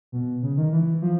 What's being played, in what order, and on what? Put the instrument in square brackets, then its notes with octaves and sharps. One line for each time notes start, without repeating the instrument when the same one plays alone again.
[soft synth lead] B2
C#3
D#3
E3
F3